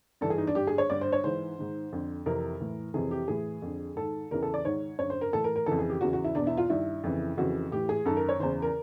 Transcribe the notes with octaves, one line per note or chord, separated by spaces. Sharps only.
G2 E3 A4
G#4
D#4
D4
G2 D3 G4
G#4
C#5
G2 D3 D5
C5
C#5
G#2 E3 C5
G#2 D#3
F2 D3
F2 C3 E3 A#4
A2 E3
F2 C3 E3 G#4
G4
A2 E3 G#4
F2 D3
G#2 D#3 A4
E2 C#3 E3 A#4
A4
D5
G#2 D#3 C#5
F#2 D3 C#5
C5
A#4
A2 E3 A4
A#4
A#4
F2 C#3 E3 A4
G#4
G4
E2 C#3 E3 F#4
F#4
E4
E2 B2 D4
E4
F4
G2 D#3 E4
F2 C#3 E3
F2 C#3 E3 F#4
A2 E3 G4
G#4
F#2 D#3 A4
A#4
C#5
E2 C#3 E3 C5
A#4